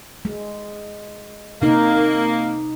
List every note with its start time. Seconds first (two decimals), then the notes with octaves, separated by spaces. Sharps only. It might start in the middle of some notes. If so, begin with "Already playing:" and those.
0.25 G#3
1.62 C3 A#3 D#4